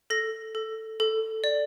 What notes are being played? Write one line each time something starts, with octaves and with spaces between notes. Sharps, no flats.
A4 A#6
A4
A4
D5